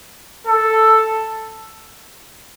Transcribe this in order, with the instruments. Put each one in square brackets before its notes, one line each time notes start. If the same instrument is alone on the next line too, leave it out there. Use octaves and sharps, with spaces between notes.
[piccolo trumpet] A4